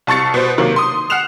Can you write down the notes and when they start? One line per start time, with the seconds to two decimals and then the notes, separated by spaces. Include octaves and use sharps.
0.07 C2 A5 C#6 A6 C#7
0.34 B2 C5
0.58 C3 D#3 F#3 A#3
0.76 C6 D#6
1.10 F#5 F6 F#6 C7 E7 F7